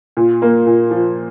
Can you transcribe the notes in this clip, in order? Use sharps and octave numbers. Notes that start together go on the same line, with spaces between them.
A#2
A#3
A#2
F3